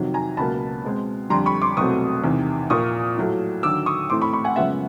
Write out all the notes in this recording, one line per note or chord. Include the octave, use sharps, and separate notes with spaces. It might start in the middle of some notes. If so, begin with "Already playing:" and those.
Already playing: F2 C3 D#3 F#3
G#5 A#5
C#2 B2 F#3 A#3 A5 B5
B2 G#3 C4
F2 D3 G3 A#5 C6
B5 C#6
C6 D6
C2 B2 F#3 A3 C4 C#6 D#6
E2 C3 D#3
A#2 F3 A#3 C#6 D#6
A2 F#3 A3
D#2 D3 F#3 D6 E6
C#6 D#6
A2 E3 A3 C4 C6 D6
B5 C#6
B5 C#6
F#5 G#5
F#2 C#3 F3 G#3 B3 E5 F#5